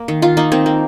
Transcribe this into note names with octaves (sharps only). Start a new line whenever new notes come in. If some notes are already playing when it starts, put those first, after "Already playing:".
Already playing: A#3
D#3
D#3 F4
A#3 D#4
D#3 C4
A#3